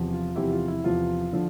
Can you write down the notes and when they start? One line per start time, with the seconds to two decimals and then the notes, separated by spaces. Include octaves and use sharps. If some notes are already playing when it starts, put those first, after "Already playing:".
Already playing: E2 C3 F3
0.12 F4
0.35 E2 C3 F3 E4 G4
0.52 F4
0.68 E4
0.84 E2 C3 F3 F4
1.33 D3 F3